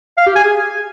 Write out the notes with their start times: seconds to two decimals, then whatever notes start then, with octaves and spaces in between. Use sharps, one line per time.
0.17 F5
0.26 G4
0.35 G#5
0.45 G#4